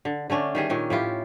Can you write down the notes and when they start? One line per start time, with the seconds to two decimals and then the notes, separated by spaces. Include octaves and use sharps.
0.05 D3
0.30 D3 A3 C#4 D4
0.55 D#3 G3 G#4
0.70 A#2 D#3 C#4
0.90 A2 E4 F4 G4